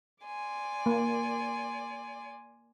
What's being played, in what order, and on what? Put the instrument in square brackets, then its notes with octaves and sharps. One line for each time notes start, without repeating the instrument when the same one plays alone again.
[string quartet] D5 G#5 C6
[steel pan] A#3